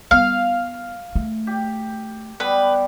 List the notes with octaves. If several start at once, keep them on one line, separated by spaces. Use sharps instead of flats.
G3 B3 F5
A3
G4
G3 B3 B4